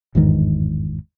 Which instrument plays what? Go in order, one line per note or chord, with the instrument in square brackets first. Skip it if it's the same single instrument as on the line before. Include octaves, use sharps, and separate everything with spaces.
[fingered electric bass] G1 E2 G#2 D#3